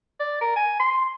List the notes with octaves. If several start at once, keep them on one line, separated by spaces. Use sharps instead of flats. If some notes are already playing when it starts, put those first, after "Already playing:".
D5
A#4
G#5
C6